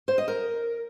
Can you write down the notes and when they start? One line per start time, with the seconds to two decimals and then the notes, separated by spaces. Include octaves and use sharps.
0.08 C5
0.18 D#5
0.28 A#4